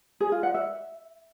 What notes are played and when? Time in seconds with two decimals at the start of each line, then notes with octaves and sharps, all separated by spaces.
0.20 G#4
0.32 F4
0.43 F#5
0.54 E5